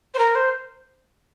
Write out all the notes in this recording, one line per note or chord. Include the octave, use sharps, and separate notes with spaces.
C5
A#4
C5